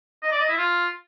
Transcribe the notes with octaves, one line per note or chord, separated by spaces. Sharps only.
D#5
D5
D#5
E4
F4